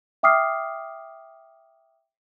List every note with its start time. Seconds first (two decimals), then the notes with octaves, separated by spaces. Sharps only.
0.23 E5 G5 D6 D#6 F6 C7